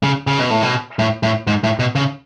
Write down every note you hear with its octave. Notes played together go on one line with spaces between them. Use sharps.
C#3
C#3
B2
A2
B2
A2
A2
G#2
A2
B2
C#3